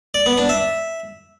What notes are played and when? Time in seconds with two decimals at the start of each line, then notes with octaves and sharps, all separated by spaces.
0.14 D5
0.26 B3
0.38 D4
0.49 E5